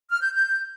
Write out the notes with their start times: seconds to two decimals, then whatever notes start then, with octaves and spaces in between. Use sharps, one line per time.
0.11 F6
0.21 G6
0.32 G6